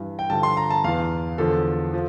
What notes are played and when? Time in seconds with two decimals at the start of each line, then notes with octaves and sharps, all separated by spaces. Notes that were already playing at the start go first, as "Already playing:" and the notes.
Already playing: G2 E3
0.19 G5
0.30 G2 D3 F3 A5
0.43 C6
0.57 A#5
0.71 A5
0.84 E2 E3 F5
1.38 E2 D3 F3 A4
1.94 F3